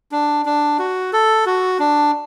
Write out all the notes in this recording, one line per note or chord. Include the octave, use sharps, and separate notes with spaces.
D4
D4
F#4
A4
F#4
D4